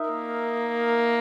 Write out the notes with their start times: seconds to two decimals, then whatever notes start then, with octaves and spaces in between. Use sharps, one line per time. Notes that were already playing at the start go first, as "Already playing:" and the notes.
Already playing: D#4 A#4 E5
0.10 A#3